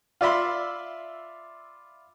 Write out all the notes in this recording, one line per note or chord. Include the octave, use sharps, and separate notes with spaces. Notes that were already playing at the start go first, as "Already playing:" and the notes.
F4 D5 E5 B5 C6